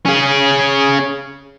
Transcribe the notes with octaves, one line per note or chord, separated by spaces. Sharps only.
C#4 G#4